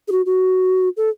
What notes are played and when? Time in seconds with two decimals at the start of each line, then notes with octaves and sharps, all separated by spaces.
0.08 G#4
0.12 F#4
0.26 F#4
0.97 A4